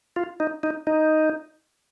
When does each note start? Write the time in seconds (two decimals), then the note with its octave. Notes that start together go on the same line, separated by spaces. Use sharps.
0.16 F4
0.40 D#4
0.63 D#4
0.87 D#4